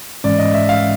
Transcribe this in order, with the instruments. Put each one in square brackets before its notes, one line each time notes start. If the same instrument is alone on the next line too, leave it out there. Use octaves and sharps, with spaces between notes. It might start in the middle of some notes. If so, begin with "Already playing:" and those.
[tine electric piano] G#2 E3 G#3 C#4 [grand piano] D5
[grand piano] D#5
E5
F5